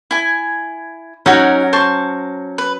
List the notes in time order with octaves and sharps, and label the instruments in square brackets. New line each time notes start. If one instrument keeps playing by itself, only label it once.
[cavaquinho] E4 G#5
[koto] F#3 C#4 A#4 [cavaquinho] D#4 F#4
[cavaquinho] C5 A5 C#6
B4